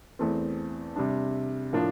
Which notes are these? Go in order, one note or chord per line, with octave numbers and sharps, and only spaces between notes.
E2 E3 A3 C4
C3 G3 D4
A2 F3 A#3 D4 F4